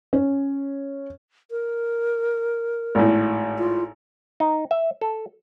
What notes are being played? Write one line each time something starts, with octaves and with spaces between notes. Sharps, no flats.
C#4
A#4
G#1 A2
F4
D#4
E5
A4